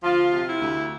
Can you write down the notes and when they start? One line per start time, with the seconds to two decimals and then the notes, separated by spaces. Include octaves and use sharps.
0.03 D2 F3 F4
0.33 C3
0.47 E4
0.60 D2